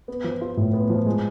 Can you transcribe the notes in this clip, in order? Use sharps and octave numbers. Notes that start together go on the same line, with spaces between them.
B3
F3
F4
A2
B3
F3
G#3